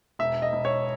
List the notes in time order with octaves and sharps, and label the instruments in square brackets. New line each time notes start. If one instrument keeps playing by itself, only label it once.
[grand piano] E1 E5
D#5
E1
C#5